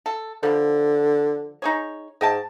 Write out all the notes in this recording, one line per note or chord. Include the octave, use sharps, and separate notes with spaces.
A4
D3 F3 G3
D#4 G#4 C#5
G#2 D#5 G5 A5